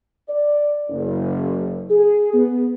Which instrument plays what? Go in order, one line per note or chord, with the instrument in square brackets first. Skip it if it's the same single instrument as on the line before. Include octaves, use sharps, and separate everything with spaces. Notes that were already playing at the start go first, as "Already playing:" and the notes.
[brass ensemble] D5
F#1
G#4
B3